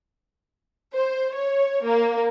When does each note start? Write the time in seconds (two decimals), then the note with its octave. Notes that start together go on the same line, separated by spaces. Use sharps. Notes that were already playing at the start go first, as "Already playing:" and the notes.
0.94 C5
1.34 C#5
1.85 A#3